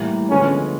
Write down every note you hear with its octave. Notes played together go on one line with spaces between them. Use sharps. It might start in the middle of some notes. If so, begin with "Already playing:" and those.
Already playing: A2 E3 G3 A#3
D3 F3 G#3 B3 C#4